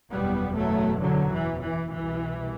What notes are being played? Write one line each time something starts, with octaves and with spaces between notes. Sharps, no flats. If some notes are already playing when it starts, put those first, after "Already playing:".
F#1 E2 B2 G3 B3
F#3 A3
D3 F#3
E3
E3
C2 B2 E3